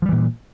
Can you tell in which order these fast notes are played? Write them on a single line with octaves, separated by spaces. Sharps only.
F3 G3 E3 A#2